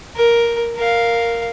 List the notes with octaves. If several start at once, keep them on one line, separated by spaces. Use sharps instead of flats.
A#4
A#4 F5